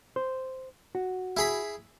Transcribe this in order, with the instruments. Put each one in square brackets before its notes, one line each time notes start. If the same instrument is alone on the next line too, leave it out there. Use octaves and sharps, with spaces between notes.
[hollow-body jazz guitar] C5
F#4
[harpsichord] E4 G#4 B5